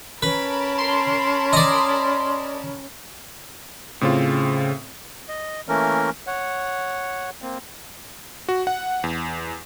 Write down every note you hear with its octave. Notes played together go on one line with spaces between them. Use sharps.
C#4 A#4 B4 A5 B5
C6
D5 D#5
A2 C#3 C4 F4
D#5
E3 A3 A#3 C#4 A#4
C#5 F#5
A#3 C4
F#4
F#5
E2